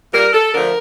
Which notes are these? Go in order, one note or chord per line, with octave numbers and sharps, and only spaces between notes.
A#2 G3 A#4
A4
D3 F3 A3 A#4